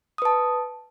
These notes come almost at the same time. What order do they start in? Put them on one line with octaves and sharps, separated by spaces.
D#6 B4 A5